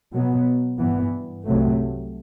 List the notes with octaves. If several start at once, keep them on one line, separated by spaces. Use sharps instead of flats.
B2 F#3 B3
G2 E3 B3
C2 C3 F#3 A3